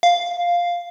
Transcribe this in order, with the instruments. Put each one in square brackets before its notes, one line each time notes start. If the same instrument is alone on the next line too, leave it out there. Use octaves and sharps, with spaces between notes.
[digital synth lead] F5